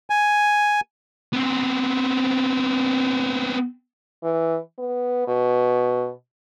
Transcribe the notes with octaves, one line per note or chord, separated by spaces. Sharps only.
G#5
B3 C4
E3
B3
B2